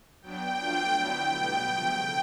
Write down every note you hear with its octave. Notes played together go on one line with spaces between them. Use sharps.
F#3 B3 D4 G5
F3 A3 D4 F4
D3 F#3 B3 E4 G5
B2 G3 B3
C#3 F3 A3